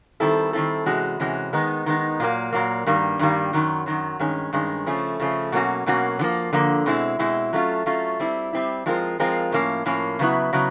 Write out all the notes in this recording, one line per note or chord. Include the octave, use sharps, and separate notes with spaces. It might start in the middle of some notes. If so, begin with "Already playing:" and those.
D#3 G3 C4 E4 A4
D#3 G3 C4 E4 A4
C3 E3 G#3 C#4 F#4
C3 E3 G#3 C#4 F#4
D#3 G#3 B3 D#4
D#3 G#3 B3 D#4
A#2 F#3 A#3
A#2 F#3 A#3
G2 D#3 G3 A#3
G2 D#3 G3 A#3
F#2 D#3 F#3
F#2 D#3 F#3
G2 D#3 G#3 C#4
G2 D#3 G#3 C#4
C#3 F3 A3 C#4
C#3 F3 A3 C#4
B2 F#3 A#3 C#4 F#4
B2 F#3 A#3 C#4 F#4
D3 F3 A#3
D3 F3 A#3
B2 G#3 C4 E4
B2 G#3 C4 E4
F#3 A3 C#4 F4
F#3 A3 C#4 F4
G3 C4 E4
G3 C4 E4
F3 G#3 C4 F4 A#4
F3 G#3 C4 F4 A#4
A2 F3 A#3 C#4
A2 F3 A#3 C#4
C#3 F#3 B3 E4
C#3 F#3 B3